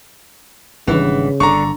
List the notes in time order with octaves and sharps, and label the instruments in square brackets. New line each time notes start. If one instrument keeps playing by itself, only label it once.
[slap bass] G#1 G3 D4 [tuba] C#3 [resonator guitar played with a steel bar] E3 B3
[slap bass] G1 [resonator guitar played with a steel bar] D3 [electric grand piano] A#5 C#6